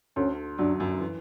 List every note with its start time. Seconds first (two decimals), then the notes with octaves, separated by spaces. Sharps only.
0.16 D2 D3 C#4
0.59 F#2 F#3 D4
0.80 F#2 F#3
1.00 E3